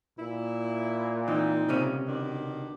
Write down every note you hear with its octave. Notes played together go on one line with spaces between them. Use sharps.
A#2 E4
E3 C4 D#4
C#2 C3 C#4
B2 D#3 D4